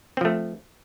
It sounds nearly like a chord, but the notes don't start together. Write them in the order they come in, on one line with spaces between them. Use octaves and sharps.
C4 F3 A3